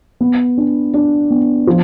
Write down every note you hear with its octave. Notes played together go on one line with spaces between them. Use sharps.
B3
D4
D4
B3
F3